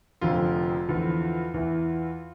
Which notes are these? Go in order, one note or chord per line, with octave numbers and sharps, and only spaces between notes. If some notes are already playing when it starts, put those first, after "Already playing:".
F1 F2 D3 F3 F4
E2 D3 F3
E2 E3